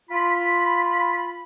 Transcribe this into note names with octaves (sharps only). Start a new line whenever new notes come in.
F4 B5